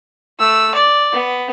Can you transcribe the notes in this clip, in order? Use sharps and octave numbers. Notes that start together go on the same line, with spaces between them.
A3 E6
D5
B3